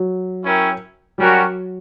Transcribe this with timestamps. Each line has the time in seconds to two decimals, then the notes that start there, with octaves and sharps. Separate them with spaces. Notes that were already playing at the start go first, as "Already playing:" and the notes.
Already playing: F#3
0.44 C#4 E4 A#4 C#5 G5
1.18 F#3 G3 C#4 F#4 A#4